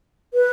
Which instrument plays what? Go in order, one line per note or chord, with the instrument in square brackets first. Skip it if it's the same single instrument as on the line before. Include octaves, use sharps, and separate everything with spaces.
[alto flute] B4